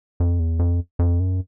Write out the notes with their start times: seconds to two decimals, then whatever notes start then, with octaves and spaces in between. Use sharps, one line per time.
0.20 F2
0.39 E2
0.59 F2
0.99 F2
1.20 F#2